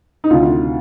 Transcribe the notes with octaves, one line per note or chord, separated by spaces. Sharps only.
D#4
D2 C3 D#3 F4